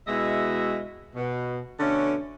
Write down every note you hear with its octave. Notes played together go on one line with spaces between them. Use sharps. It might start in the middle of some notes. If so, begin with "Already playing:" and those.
B2 G#3 E4 F#4 D#5 E5
B2
B2 D3 A3 C#4